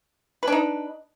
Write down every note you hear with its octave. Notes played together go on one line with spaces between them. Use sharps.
D4 D#4 B4